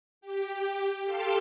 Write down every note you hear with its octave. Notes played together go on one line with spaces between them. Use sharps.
G4
G4 A4 F5 G5 A5 C6